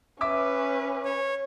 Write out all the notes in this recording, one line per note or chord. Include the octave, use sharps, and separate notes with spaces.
C#4 B4 E5 D6 E6
C#5